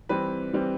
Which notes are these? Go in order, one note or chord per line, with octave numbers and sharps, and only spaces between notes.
E3 G3 C4 B4
E3 G3 C4